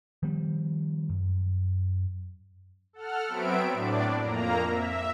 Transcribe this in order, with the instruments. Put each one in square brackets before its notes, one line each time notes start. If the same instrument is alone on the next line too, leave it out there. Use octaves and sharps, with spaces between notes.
[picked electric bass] D#3 F3 G3 B3
F#2
[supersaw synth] A4 F#5 F6
F#3 B3 C4 E5 D7
A2 D4 D5
F2 A#3 A#5
E5